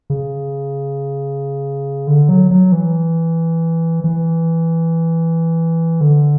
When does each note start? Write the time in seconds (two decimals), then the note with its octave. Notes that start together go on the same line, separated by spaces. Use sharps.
0.10 C#3
2.07 D3
2.29 F#3
2.51 F#3
2.72 E3
4.04 E3
6.01 D3